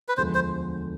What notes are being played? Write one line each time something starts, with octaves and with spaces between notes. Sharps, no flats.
B4
E1 D2 D3 F3 G#3 C5
C5